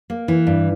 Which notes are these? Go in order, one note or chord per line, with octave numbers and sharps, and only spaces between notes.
A#3
E3
G2